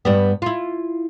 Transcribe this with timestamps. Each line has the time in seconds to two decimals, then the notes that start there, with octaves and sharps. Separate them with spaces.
0.05 G2 G3 B3
0.42 E4 F4